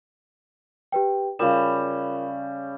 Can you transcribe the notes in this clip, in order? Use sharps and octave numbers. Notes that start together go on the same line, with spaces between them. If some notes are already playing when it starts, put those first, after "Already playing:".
G4 B4 G5
C#3 G3 F4 A#4 E7